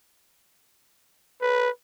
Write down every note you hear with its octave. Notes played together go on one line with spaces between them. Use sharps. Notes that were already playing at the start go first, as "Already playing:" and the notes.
B4